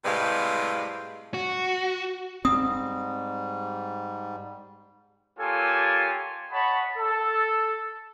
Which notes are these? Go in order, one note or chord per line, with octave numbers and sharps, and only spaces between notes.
A2 C3 G3 G#3 B4 F5
F#4
G#2 G3 C4 D#6
A#3 F4 G4 A4 C#5 G#5
C#5 D#5 F#5 A5 B5
A4